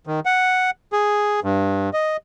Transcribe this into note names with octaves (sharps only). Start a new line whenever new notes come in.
D#3
F#5
G#4
G2
D#5